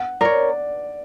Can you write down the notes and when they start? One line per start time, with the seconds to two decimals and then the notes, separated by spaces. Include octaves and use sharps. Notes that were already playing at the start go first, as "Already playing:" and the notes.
Already playing: F#5
0.21 A#4 C#5 D5